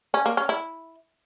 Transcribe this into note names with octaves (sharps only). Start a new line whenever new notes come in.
C#4
A#3
C#4
E4